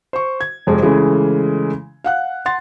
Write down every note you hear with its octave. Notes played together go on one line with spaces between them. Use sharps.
C5 C#6
G#6
F1 F2 G#3
C#3 E3 G#3 A3
F5 F#5 F#6
F#5 C6 A6